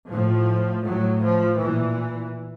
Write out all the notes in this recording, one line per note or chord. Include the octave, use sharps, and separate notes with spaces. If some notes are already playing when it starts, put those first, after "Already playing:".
A2 F3
A2 F#3
F3
A#2 E3